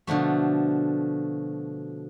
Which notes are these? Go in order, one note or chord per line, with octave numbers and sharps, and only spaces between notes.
B2 D3 F3 A3